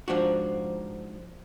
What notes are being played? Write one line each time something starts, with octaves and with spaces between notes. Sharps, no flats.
G#2 F3 D4 F#4